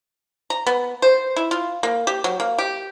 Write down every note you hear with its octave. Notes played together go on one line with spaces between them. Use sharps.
A#5
B3
C5
E4
F4
A#3
G4
F#3
A#3
G4